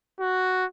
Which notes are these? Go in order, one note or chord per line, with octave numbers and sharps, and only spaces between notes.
F#4